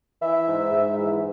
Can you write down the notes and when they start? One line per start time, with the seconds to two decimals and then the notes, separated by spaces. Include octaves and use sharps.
0.21 E3 E5
0.47 G#2
0.72 G#2
0.98 E3